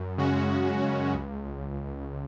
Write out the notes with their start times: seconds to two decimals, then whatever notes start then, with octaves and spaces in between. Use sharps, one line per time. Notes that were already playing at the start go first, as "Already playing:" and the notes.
Already playing: F#2
0.18 C#3 G#3 C#4 F#4
0.50 F#2
0.81 C#3 G#3 C#4 F#4
1.13 C#2